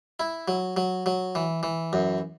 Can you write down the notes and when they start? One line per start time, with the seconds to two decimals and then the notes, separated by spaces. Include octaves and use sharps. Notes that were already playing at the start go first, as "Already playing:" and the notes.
0.20 E4
0.48 F#3
0.77 F#3
1.06 F#3
1.35 E3
1.63 E3
1.93 F#2